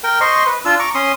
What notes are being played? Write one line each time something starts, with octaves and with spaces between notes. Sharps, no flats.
A#4 G5
C5 D#5 C6 C#6
B4
D4 F4 E6
A#5 C#6 D6
C#4 C6 D#6